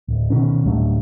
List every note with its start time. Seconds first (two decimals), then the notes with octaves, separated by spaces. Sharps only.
0.08 D1
0.30 B2 D#3 C#4
0.65 D1 G2 F#3 A3